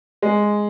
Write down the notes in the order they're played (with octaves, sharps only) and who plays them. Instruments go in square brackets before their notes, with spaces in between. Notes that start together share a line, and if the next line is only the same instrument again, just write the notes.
[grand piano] G#3